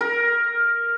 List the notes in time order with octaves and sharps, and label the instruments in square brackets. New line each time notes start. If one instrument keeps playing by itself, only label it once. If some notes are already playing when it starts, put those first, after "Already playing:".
[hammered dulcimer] A#4